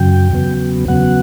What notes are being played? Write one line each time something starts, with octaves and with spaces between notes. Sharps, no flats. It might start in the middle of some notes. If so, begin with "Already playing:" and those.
Already playing: F#2 C#3 F#3 G5
E2 C#3 F#3 B3
E2 C#3 F#3 B3 F#5